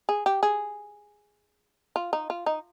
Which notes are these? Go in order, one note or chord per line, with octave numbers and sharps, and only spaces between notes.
G#4
G4
G#4
F4
D#4
F4
D#4